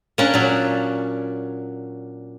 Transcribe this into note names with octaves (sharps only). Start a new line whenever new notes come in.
A#3 C#4 D4
A#2 F#3